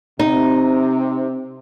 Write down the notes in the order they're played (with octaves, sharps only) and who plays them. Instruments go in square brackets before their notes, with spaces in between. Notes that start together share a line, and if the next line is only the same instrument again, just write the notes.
[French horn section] C3 [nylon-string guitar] D#4